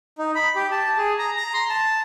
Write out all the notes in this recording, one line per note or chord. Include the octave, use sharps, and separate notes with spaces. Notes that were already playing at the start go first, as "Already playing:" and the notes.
D#4
B5
G4
A5
G#4
A#5
A#5
C6
A5